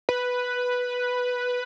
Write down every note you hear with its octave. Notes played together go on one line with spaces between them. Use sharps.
B4